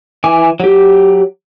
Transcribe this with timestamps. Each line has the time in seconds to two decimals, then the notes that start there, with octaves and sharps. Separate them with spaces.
0.24 E3 G#5 D6
0.60 F#3 G4